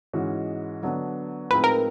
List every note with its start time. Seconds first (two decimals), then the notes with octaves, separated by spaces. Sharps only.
0.13 G#2 E3 G#3 C#4 F#4
0.83 D3 F#3 B3 D4
1.51 A2 F3 G#3 C4 D#4 B4
1.64 A#4